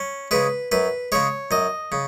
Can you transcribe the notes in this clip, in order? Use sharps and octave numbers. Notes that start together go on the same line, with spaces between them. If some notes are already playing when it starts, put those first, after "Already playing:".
Already playing: C#4
C#3 G#3 B4
F#2 B4
C#3 G#3 C#5
F#2 D#5
C#3